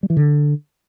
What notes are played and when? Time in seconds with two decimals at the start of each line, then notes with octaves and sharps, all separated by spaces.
0.03 G3
0.10 E3
0.17 D3